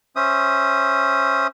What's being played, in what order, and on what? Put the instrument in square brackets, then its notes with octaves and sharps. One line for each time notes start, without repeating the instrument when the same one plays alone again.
[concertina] C#4 C5 E5 D#6